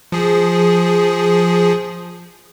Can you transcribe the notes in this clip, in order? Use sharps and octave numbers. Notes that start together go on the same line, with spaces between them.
F3 G#4